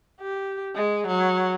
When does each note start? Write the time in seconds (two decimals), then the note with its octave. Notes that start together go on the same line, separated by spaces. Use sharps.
0.20 G4
0.75 G#3
1.07 F#3